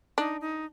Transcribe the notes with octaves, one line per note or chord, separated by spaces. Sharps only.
D4 D#4
D#4